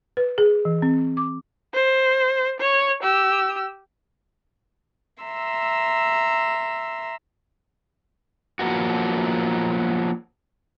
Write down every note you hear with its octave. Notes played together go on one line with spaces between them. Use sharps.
B4
G#4
E3
C4
D6
C5
C#5
G4 E6
E5 A#5 C6 E6
F3 F#3 A#3 B3 F#4